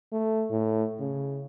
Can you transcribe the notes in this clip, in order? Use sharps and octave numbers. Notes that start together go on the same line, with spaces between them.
A3
A2
C#3